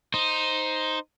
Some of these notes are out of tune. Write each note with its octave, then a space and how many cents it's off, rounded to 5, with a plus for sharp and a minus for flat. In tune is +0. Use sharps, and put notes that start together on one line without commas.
D#4 +0 C5 +0